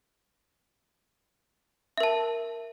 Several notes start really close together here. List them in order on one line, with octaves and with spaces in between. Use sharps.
E5 A#4 A5